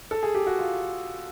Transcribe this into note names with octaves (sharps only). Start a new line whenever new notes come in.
A4
G#4
G4
F#4
F4